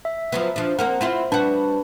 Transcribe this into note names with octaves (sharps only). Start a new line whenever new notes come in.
E5
F3 F#3 B3
F3 D4
A#3 C4 A#4 F#5
C4 E4 F4
G3 D4 F#4 B4 A5